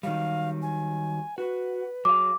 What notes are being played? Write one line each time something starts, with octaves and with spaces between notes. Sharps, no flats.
D#3 F#3 G3 F5
G#5
F#4 B4
F#3 G#4 F5 D6